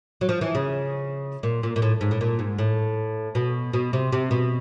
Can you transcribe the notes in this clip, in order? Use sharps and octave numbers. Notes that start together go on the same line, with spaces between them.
F#3
F3
E3
C#3
A#2
A#2
A#2
A2
G#2
A2
A#2
G#2
A2
B2
B2
C3
C3
B2